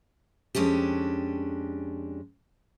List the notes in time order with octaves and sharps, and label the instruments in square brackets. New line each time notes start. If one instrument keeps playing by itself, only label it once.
[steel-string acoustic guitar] F2 G#3 C#4 D4 G4